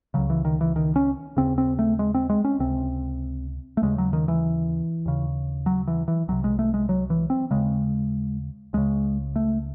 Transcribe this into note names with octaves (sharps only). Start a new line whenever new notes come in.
C#2 C#3 F#3
E3
D#3
E3
D#3
C#4
D#2 C#3 C4
C4
A3
G#3
C4
G#3
C#4
C#2 C3 C4
A3
D#2 C#3 G#3
F#3
D#3
E3
D#2 C#3
F#3
E3
E3
C2 C3 F#3
G#3
A3
G#3
F#3
E3
C4
D#2 C#3 G#3
C#2 C#3 G#3
A3